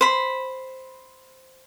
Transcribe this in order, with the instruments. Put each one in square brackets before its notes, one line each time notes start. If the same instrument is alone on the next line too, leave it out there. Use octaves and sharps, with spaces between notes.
[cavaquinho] C5 B5